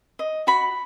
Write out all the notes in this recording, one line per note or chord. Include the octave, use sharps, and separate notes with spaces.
D#5
F#4 B5